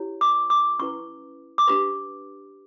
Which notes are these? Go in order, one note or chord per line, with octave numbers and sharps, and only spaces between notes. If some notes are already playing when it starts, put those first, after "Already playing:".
Already playing: E4 G4 C#5
D6
D6
C#4 E4 B4 C#6
D6
D4 G4 B4 C#6